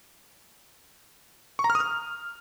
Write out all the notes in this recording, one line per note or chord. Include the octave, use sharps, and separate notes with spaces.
C#6
A#5
F6
D#6
F6